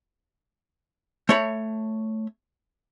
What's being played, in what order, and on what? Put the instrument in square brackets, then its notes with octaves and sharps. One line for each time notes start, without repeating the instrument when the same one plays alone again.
[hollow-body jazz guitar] A3 C#5 B5